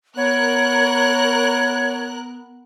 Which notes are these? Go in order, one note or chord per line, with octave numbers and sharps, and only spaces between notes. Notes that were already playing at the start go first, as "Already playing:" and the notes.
B3 A#4 C#5 F#6